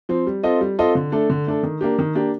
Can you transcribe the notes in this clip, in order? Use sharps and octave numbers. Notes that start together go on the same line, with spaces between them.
F3 C4
G3
C4 F4 A4 D#5
G3
C4 F4 A4 D#5
D3
A3 D4 A4
D3
A3 D4 A4
D#3
A#3 D4 G4
D#3
A#3 D4 G4